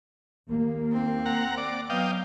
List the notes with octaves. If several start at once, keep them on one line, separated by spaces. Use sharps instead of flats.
D#2 A#3
C4
F#5 A#5
D5
F#3 B3 D#5 F5 G5